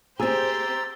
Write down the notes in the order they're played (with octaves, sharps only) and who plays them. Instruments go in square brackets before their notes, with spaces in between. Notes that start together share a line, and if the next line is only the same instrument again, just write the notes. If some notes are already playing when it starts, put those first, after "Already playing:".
[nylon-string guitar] C4 G#4 [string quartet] G4 C5 [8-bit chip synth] A#5 E6 A6